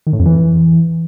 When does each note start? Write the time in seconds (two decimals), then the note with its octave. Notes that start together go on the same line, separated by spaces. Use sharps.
0.07 D#3
0.13 A2
0.19 F2
0.26 E3